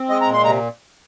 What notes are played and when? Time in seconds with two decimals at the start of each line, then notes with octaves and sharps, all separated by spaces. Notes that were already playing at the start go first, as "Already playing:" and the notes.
Already playing: C4
0.09 G#3 D#5
0.21 A#5
0.27 A#2
0.33 C6
0.44 C3 A#5